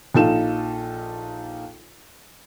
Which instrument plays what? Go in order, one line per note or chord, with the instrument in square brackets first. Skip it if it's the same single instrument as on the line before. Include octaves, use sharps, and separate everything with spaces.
[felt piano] A#1 D#4 F4 A4 E7